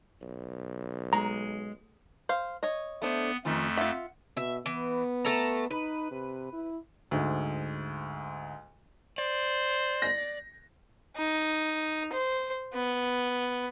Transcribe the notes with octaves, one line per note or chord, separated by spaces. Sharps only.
B1
G#3 A#5
C5 F5
C#5 D#5
A3 B3 D4 C5
F2 D#3 F3 A3 C#4
F4 E5 F#5
B2 E5
E3 B3
A3 A4 A#5
D#4 B4
C3
E4
D2 G#2
C5 D5
A#6
D#4
C5
B3